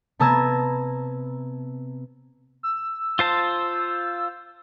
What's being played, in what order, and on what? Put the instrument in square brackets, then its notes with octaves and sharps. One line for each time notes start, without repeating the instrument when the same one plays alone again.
[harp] C3 B3 A5 A#5 E6 G#6
[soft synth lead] E6
[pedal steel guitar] F4 C5 A5